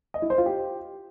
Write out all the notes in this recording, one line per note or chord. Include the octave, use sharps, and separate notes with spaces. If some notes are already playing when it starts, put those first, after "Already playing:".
D#5
E4
C5
F4
G4